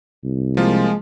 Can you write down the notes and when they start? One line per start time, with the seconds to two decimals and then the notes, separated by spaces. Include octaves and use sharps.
0.24 C2
0.57 F3 G#3 A#3 F4